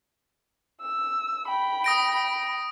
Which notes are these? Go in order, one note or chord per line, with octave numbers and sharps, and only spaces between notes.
E6
G5 B5
D#6 A#6 D7